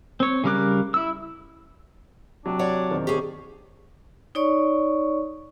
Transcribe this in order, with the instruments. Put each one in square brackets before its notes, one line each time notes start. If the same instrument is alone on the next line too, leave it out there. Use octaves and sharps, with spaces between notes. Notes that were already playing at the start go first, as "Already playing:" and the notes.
[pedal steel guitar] C4 C#5
C#3 G3 A#4 D6 F#6
E4 E6
[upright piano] C3 F#3 [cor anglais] D4
[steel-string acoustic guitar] C#5 D5 F#5
[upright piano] E1 D#3 C4
[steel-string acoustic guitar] G4 G#4 [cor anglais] C#5
[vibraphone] D#4 C#5 D5 C#6